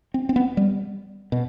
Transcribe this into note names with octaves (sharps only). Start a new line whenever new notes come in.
C4
C4
B3
G3
B2